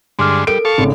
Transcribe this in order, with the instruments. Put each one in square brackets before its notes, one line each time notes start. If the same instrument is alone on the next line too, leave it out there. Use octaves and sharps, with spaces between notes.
[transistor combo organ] G2 D3 G#3 [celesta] C6 D6 F6
[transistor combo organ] G3 [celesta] A4 A#4 [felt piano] D7
[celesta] A4 [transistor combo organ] F5 A5 C#6
[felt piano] G#1 C#3